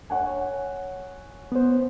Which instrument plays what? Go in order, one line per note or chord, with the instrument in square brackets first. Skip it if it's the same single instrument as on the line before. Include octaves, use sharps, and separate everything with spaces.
[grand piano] C#5 F#5 G#5
[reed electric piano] B3 C5